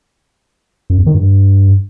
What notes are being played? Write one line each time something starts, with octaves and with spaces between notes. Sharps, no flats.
F#2
E2
D#3
G2